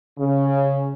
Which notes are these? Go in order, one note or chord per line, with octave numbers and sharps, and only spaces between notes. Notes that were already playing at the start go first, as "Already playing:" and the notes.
C#3